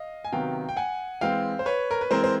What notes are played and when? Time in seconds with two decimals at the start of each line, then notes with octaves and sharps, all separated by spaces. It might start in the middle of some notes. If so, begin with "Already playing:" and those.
Already playing: D#5 F5
0.25 G#5
0.32 C3 D#3 F#3 B3 F5 G5
0.69 G5
0.77 F#5 G#5
1.21 E3 G#3 C4 F5 G5
1.59 C5
1.66 B4 C#5
1.91 A#4
2.01 B4
2.11 E3 G#3 C4 A#4 C5
2.24 C5